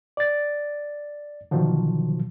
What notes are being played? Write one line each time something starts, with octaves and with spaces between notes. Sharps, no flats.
D5 A6
B2 D3 D#3 F3 F#3